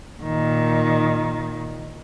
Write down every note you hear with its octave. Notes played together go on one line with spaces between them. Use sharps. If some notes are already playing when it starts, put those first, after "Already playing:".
A#2 D#3